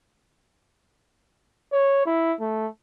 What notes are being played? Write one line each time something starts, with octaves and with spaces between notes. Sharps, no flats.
C#5
E4
A3